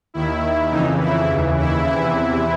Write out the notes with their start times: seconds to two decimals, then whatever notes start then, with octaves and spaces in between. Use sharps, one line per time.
0.14 D#2 D#3 E4
0.71 F2 C#3 E3 D#4
1.00 E4
1.29 D#2 C#3 E3
1.58 E4
1.87 E2 C3 E3 E4